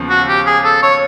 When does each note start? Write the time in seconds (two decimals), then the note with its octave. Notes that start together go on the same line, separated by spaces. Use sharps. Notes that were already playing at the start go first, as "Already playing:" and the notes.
Already playing: D#2 C#3 F3 B3
0.10 F#4
0.28 G4
0.47 G#4
0.65 A4
0.83 C#5